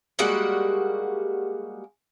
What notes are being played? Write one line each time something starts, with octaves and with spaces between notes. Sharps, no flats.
G3 G#3 A#3 F#4